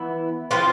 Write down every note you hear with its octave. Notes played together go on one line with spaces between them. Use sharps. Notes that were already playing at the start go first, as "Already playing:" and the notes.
Already playing: E3 B3 E4
F3 C4 F4 B4